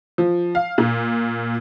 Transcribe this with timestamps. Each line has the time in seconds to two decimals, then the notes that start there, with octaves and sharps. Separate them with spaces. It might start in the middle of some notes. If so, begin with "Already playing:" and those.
0.18 F3
0.55 F5
0.78 A#2